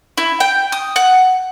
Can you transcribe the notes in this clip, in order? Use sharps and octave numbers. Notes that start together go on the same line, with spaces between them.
E4
G5
D#6
F#5